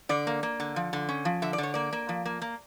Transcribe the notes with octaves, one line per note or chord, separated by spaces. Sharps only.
D3 D5
A#3
A#3
D3
F3
D3
C#4
F3
D3 E5
D5
D3 C#5
A#3 D5
A#3
F3
A#3
A#3